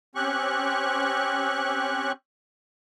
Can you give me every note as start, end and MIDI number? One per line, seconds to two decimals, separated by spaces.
0.15 2.12 60
0.15 2.12 61
0.15 2.12 67
0.15 2.12 85
0.15 2.12 90